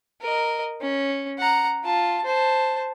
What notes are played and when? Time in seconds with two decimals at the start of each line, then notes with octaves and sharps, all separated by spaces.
0.21 A#4 D#5
0.81 C#4
1.39 F#5 A#5
1.84 F4 A5
2.25 C5 A5